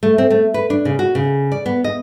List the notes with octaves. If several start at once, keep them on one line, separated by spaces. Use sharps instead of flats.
A3
C4
A3
B4
D4
C#3
F#4
C#3
D5
B3
D#5